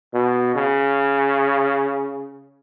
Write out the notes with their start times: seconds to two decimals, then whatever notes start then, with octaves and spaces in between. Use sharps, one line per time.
0.13 B2
0.55 C#3